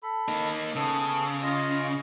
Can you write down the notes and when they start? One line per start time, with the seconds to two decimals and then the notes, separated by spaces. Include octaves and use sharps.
0.03 A4 B5
0.28 A#3 D#4
0.76 C#3 B3 A4
1.43 F4 D#5